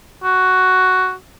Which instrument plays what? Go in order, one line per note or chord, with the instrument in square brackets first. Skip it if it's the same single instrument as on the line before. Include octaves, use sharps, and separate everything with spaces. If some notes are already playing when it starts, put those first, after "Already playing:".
[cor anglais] F#4